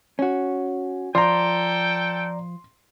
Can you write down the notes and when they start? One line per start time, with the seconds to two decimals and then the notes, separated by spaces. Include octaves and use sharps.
0.19 C#4 F#4
1.15 F3 A4 D5 G5 A#5 C6